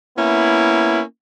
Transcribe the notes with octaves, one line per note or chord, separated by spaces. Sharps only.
A#3 B3 C#4 E4